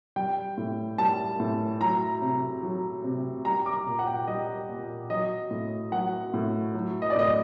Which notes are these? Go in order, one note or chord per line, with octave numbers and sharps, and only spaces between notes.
G3 G5
A2
G3 A5
A2
F#3 A#5
C3
F#3
C3
G3 A#5
D6
A#2
F#5
G5
G3 D#5
A#2
F#3 D#5
A2
F#3 F#5
A2
F#3
D#5
D5
A2 D#5